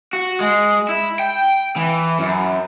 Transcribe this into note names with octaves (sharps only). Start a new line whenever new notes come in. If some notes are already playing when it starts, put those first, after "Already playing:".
F#4
G#3
E4
G5
E3
F#2